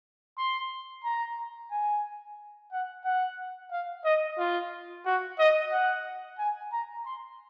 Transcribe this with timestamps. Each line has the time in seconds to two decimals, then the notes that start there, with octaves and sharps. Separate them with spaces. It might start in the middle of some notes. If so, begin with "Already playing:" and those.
0.38 C6
1.04 A#5
1.71 G#5
2.72 F#5
3.05 F#5
3.72 F5
4.04 D#5
4.39 F4
5.05 F#4
5.39 D#5
5.72 F#5
6.39 G#5
6.72 A#5
7.06 C6